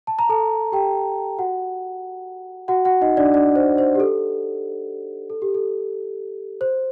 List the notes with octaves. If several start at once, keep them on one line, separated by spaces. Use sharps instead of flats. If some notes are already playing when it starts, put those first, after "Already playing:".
A5
A#5
A4 A5
G4 G5
F#4 F#5
F#4 F#5
F#4 F#5
D#4 D#5
D4 D5
D4 D5
C5
C5
G4
A4
A4
G4
A4
C5